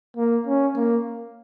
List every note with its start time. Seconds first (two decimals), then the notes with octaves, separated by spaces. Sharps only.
0.17 A#3
0.47 C#4
0.76 A#3